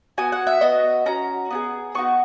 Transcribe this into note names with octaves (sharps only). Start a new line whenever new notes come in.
B3 F#4 G#5
F#5
E5
B3 F#4 D#5
C#4 F#4 A#5
B3 E4 G#4
B3 D#4 F#4 C#6